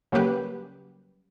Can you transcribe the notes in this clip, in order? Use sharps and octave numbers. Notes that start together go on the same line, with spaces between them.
C#3 F#3 G3 A#3 G4 B4